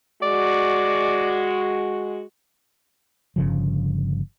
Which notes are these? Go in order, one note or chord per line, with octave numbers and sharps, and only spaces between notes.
G#3 F#4 D5
G1 C#3 F3